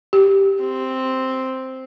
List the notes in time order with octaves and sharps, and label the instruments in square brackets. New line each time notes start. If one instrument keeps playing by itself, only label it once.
[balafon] G4
[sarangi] C4